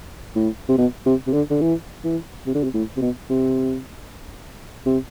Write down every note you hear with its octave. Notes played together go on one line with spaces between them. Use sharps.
A2
C3
B2
C3
C3
D3
D3
E3
E3
C3
D3
C3
A2
C3
B2
C3
C3